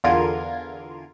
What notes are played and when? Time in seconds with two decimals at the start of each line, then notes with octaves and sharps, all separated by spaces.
0.04 E2 D3 F4 A#4 G#6